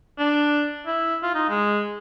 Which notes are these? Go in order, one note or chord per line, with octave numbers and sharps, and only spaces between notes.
D4
E4
F4
D#4
G#3